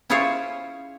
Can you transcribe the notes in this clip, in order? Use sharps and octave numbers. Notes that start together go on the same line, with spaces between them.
C#4 E4 F4 G#4 C5 C#5